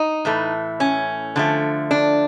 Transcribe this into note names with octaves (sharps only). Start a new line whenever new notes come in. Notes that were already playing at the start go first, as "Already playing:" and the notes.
Already playing: D#4
A2 E3 A3
C#4
D3 F3 A3
D4